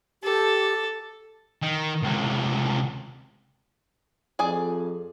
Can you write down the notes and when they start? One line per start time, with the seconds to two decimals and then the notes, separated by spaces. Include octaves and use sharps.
0.23 G4 A4
1.62 D#3
2.03 C#2 C3
4.39 F2 G#4 D5 G#5